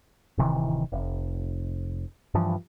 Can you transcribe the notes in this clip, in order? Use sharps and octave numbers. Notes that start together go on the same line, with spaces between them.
D1 C3 D#3 E3
F1
G2 E3 F3